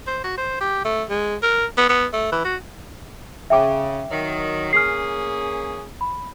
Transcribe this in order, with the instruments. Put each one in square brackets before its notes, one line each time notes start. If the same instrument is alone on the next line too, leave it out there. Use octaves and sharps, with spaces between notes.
[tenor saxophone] C5
F#4
C5
G4
A3
G#3
A#4
B3
B3
A3
E3
F#4
[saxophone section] C#3 [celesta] E5 G5 D6
[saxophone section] D#3 F#3
[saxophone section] A#3 C#4 G#4 [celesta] F6 C7
[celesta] B5